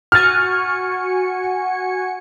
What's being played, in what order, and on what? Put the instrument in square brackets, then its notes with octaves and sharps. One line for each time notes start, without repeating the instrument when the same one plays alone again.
[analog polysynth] F#4 G#5 C#7 [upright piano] F6 A6